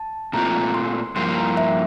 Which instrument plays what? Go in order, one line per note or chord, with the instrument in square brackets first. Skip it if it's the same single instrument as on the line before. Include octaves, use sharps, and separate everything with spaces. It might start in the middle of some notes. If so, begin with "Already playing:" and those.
Already playing: [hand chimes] A5
[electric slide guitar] A#2 A3 C4 F4 [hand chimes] A#5
[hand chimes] C6
[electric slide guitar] G2 F3 A#3 F4 [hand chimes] C6
[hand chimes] A#5
E5